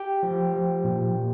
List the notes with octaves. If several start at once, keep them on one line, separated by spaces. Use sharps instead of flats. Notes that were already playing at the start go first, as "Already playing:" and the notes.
Already playing: G4 G5
F3
F3
A#2
A#2